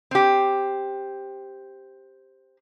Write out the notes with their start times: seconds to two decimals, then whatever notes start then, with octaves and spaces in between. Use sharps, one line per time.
0.11 C4 G4